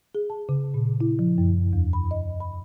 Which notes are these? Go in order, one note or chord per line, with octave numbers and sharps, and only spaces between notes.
G#4
A5
C#3
A#2
E4
F3
F#2
E2
B5
D#5
B5